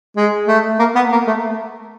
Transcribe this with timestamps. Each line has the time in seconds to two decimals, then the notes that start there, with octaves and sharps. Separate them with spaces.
0.17 G#3
0.48 A3
0.79 A#3
0.95 B3
1.12 A#3
1.27 A3